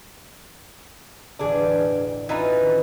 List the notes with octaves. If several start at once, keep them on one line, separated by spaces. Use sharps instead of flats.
E1 A1 D3 D4 G#4
E3 C#4 D#4 F4 B4
D#3 C4 C#4